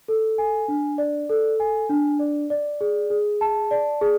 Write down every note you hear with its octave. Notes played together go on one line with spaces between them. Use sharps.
A4
G#5
D4
D5
A4
G#5
D4
D5
D5
G#4
G#4
A5
D5
G#4